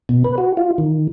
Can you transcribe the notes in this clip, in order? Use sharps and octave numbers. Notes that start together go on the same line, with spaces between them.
B2
B4
F#4
F4
D#3